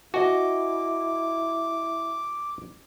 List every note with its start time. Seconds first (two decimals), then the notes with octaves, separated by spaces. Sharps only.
0.14 E4 F#4 D#5 G#5 D6